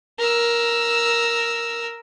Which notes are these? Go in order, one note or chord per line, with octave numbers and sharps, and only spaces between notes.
A#4 E6